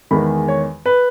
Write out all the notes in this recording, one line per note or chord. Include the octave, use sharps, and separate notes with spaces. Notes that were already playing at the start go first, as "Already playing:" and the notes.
E2 D#3 G#3 B5
C#5
B4